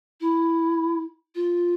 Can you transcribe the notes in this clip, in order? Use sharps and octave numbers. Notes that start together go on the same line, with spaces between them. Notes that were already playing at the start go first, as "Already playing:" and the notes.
E4
F4